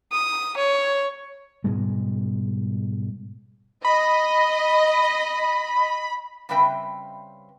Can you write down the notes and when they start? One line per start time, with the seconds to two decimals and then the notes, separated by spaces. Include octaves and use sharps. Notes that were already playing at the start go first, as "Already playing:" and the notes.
0.12 D#6
0.57 C#5
1.64 G#2 B2 G3 G#3
3.85 D#5 B5
6.49 C#3 G3 C4 B4 E5 G5